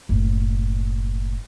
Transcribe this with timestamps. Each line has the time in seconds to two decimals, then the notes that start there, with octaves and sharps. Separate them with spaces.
0.09 F#1 A2